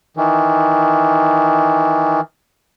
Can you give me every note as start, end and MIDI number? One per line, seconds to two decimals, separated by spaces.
0.17 2.20 51
0.17 2.20 52